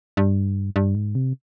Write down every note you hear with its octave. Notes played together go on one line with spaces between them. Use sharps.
G2
G2
G#2
C3